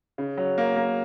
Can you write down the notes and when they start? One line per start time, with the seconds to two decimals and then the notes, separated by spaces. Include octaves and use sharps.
0.18 C#3
0.37 F#3
0.58 A#3
0.76 A#3